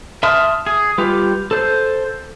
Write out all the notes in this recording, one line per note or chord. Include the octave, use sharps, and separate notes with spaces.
E5 A5 C6 D#6 F6
G#4
G3 F4 G4 B4
A4 C5